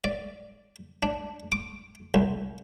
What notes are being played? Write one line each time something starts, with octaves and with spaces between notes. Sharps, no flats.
D5
D4
D6
C2